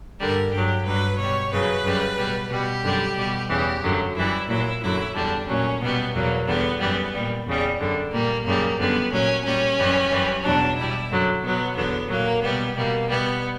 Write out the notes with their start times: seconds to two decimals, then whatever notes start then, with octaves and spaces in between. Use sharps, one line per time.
0.19 G2 D3 G3 A#4
0.52 G2 F#3 G4
0.85 G2 F#3 B4
1.18 B2 C#5
1.23 G3
1.51 F#2 C#3 F#3 B4
1.84 F#2 C#3 G3
2.17 B2 G3
2.50 B2 G3 G4
2.83 F#2 D3 G3
3.17 B2 G3
3.49 E2 C#3 E3 G4
3.83 F#2 D3 F#3
4.15 F#2 E3 G3 E4
4.48 A#2 F#3 E4
4.82 F#2 D3 F#3 E4
5.15 E2 D3 G3 D4
5.47 A#2 F#3 C#4
5.80 B2 G3 B3
6.14 E2 B2 F#3 A#3
6.47 E2 D3 G3 B3
6.80 F#2 E3 G3 B3
7.14 A#2 G3
7.47 E2 C#3 G3
7.79 F#2 D3 G3
8.12 A#2 G3 A#3
8.45 F#2 C#3 G3 A#3
8.78 F#2 D3 G3 B3
9.11 A#2 F#3 C#4
9.45 A#2 G3 C#4
9.78 F#2 E3 G3
10.11 F#2 E3 G3
10.43 E2 B2 F#3 D4
10.76 B2 G3 E4
11.09 F#2 D3 F#3
11.43 B2 F#3 B3
11.76 E2 D3 F#3 B3
12.09 A#2 F#3 A#3
12.42 B2 G3 B3
12.75 B2 G3 A#3
13.09 B2 G3 B3